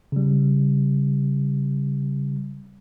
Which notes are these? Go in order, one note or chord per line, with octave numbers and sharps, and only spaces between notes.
C#3 G3